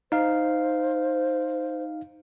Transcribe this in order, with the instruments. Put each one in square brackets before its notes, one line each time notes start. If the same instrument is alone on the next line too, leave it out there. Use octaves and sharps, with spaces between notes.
[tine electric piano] D#4 F5 [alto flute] C5